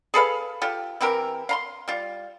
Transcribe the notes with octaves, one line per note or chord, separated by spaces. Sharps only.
G#4 A4 B4 F5
F4 G4 A4
E3 C4 G4 A#4
F5 A#5 C6
G3 F4